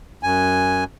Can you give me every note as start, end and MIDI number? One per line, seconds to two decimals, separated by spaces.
0.23 0.84 42
0.23 0.84 80